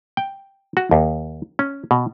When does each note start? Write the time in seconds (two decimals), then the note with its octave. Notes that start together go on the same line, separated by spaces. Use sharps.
0.17 G5
0.77 F#4
0.91 D#2
1.59 C#4
1.91 B2